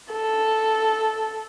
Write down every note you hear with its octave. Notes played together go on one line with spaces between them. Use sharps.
A4